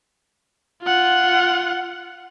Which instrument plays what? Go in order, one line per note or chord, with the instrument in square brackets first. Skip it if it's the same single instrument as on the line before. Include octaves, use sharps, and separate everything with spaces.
[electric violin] F4 F#5